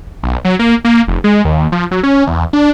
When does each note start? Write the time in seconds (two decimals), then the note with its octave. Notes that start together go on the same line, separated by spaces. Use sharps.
0.23 B1
0.45 F#3
0.59 A#3
0.85 A#3
1.08 F1
1.24 G#3
1.45 D#2
1.72 F3
1.91 F#3
2.03 C#4
2.27 E2
2.53 D4